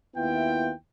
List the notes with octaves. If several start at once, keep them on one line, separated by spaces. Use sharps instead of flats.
D#2 B3 E4 F4 E5 G5